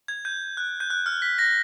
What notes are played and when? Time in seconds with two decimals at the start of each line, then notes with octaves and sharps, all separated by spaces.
0.08 G#6
0.25 G6
0.57 F#6
0.80 G6
0.90 F#6
1.06 F6
1.22 B6
1.39 A#6